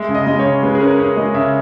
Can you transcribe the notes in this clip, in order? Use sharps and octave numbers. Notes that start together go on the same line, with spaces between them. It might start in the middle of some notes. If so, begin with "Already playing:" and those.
Already playing: G#3 E5
C#3
D#5
G#3 D#5
C#5
C#3
G#3 B4
G#4
C#4 A#4
C#4 C#5
G#3 D#5
C#3 E5